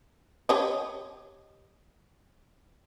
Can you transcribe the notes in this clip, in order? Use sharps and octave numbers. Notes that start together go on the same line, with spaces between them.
G4 C#5 D#5